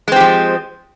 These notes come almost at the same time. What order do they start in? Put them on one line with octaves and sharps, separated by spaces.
G#3 C4 G4 F3